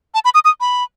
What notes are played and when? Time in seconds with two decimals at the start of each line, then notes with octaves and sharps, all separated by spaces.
0.14 A5
0.25 B5
0.34 D#6
0.45 D#6
0.61 B5